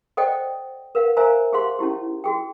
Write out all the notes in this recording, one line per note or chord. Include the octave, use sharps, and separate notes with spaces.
A4 C5 D5 D#5 F#5 G5
A#4 B4 F5 F#5
A#4 C5 E5 F5 G#5 A#5
G4 G#4 C5 F5 F#5 C6
C#4 D#4 E4 G4
F#4 G#4 G5